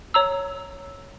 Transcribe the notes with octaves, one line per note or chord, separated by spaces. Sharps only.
C#5 A#5 E6